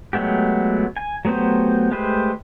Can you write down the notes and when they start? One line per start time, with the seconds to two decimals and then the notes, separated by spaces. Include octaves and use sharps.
0.13 F#3 G#3 A3 B3 G4
0.97 G#5
1.25 F#3 A3 B3 G4 C5
1.91 G#3 A3 G4 B4 C5